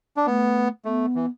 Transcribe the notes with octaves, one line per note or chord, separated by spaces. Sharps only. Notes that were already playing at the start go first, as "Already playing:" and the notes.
D4
A3 B3
A3 B3
E3